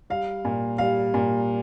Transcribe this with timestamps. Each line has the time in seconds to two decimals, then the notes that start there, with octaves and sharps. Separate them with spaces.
0.10 G3 F5
0.45 A#2
0.78 G3 F5
1.14 A#2